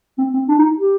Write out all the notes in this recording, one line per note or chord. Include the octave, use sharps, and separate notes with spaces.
C4
C4
D4
D#4
G4